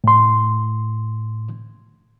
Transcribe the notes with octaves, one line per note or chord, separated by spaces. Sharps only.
A2 C6